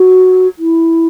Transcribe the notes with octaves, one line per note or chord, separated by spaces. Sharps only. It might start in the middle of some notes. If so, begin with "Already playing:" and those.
Already playing: F#4
E4